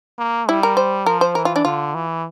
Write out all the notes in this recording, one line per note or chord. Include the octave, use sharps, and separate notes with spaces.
A#3
G3 E4
A#4
C5
F3 A#4
C5
E3 A#4
F4
D4
D3 F4
E3